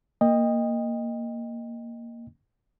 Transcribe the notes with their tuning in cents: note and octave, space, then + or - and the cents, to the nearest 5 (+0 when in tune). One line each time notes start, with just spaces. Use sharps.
A#3 +0 D#5 -5 G5 +30